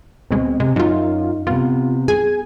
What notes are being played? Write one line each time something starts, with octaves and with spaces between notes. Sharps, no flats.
D2 B2 G#3 C4
C3 G#3
F#2 D#4 F4
C3 B3 F4
G#4 G#5